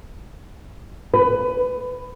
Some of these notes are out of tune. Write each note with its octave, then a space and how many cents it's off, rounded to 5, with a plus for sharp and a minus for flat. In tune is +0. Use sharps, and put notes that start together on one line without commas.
B4 +20